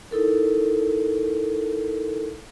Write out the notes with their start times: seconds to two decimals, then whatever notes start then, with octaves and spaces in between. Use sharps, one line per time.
0.11 D#4 E4 A4 A#4